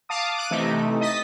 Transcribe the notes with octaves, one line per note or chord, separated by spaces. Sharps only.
F5 A5 D6 D#6
D6 F#6 D#7
C3 E3 A3 D#4
D#5 D#6 A6 B6